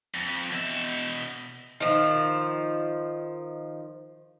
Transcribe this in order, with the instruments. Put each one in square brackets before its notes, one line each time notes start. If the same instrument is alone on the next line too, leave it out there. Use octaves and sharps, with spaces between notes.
[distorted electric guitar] F2
B2 E5
[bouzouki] D#3 F3